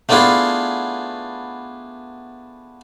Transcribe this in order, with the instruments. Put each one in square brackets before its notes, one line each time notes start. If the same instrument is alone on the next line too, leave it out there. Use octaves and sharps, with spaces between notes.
[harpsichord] A3 B3 D4 E4 F4 G#4